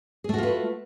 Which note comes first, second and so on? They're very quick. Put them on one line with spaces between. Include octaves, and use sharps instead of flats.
G#4 A3 F#4 F4 B4